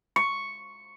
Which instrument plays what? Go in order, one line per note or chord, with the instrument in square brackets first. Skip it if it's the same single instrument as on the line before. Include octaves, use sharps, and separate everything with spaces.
[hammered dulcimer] C#6